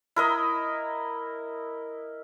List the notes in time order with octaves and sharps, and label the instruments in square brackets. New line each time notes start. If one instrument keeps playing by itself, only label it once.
[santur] E4 A#4 D#5